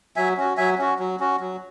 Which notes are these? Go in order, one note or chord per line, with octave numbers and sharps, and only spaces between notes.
F#3 E5 G#5
C#4 F#4
F#3 E5 G#5
C#4 F#4
F#3
C#4 F#4
F#3